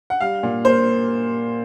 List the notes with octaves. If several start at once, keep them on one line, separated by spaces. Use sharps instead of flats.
F#5
G3 F5
A#2
A#3 C5